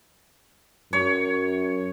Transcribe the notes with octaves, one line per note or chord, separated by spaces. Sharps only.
F#2 C#5